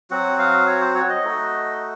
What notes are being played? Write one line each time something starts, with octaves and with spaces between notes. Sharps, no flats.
F#3 C4 F#4 F#5
F5
C#5
C5
C#5
D#5
A3 D#4 F#4